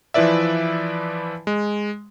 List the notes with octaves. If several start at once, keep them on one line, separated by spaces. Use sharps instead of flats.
E3 F3 E4 B4 D5 E5
G#3